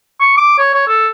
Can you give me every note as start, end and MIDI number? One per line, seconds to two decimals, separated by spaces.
0.21 0.36 85
0.37 0.55 86
0.59 0.71 73
0.74 0.87 73
0.88 1.09 69